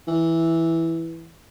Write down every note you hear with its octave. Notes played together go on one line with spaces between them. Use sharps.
E3